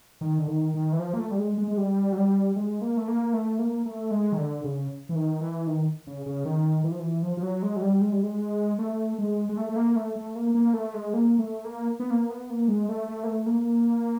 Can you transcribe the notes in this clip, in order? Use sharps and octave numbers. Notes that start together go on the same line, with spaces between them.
D#3
D3
D#3
D#3
E3
F3
A#3
A3
G3
G#3
G#3
G#3
G3
F#3
G3
G#3
A#3
A3
A#3
A3
A#3
A3
G#3
D#3
D3
C#3
E3
D#3
E3
D#3
C#3
C#3
D#3
E3
F3
E3
F3
F3
F#3
G#3
F#3
G3
G#3
G3
G#3
A3
G#3
G#3
A3
A3
A#3
A3
A3
A#3
A#3
A3
G#3
A#3
A3
A#3
B3
A#3
B3
A#3
G#3
A3
A3
A#3
A3
A#3